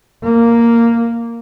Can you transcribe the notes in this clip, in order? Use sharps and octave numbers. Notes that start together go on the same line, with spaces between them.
A#3